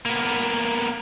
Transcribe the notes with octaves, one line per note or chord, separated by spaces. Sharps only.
A#3 B3